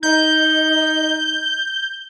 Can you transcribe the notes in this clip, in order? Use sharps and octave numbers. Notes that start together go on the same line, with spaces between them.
D#4 G6